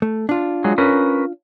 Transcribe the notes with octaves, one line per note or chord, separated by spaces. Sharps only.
A3
D4 F4
F#3 G#3
C#4 A#4 B4